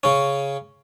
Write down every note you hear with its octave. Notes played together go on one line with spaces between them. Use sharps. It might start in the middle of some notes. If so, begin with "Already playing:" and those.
C#3 C#4